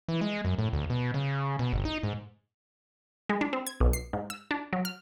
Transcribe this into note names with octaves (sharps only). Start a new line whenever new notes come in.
E3
G#3
F#2
A2
D2
B2
C#3
B2
G1
D#4
G#2
G#3
D4
C4
G#6
B1
C7
G#2
E6
D4
F#3
F6